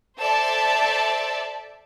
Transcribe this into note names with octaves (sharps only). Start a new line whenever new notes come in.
A4 C5 D5 E5 A5